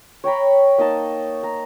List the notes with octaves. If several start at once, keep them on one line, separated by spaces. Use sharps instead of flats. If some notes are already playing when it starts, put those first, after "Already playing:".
C#5 G5 A#5 B5
A#3 D#4 D#5 A5
A#5